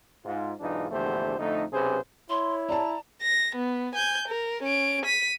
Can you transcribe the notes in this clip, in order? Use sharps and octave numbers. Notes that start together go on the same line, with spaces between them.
G#2 F4
B1 G#2 E3 D4 D#4 F4
A#1 E2 D3 A3 G4 C5
F2 D3 A3 D#4
B1 C3 C#4 G#4 B4 C5
E4 C#5 C6
D5 A5 A#5
A#6
B3
G#5 G6
A#4
C#4 D7
B6 D#7